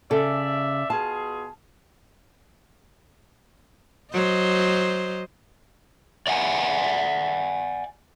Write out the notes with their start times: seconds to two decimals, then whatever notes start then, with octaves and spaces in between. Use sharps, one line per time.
0.11 C#3 A4 D5 E5
0.90 B2 F4 G#4 A5
4.13 F#3 C5 D#5
6.27 D5 E5 F#5 G#5